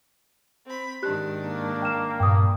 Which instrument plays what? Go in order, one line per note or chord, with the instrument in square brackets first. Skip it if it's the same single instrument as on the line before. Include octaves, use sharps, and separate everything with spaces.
[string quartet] C4 B5
[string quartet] G#2 D#3 D4 [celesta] G4 F#6
[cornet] A#3
[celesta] G5 F6 E7
[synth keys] G2 A#2 [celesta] G5 D#6